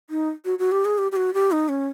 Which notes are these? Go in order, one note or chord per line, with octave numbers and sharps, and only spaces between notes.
D#4
F#4
F#4
G4
G#4
G4
G4
F#4
G4
D#4
C#4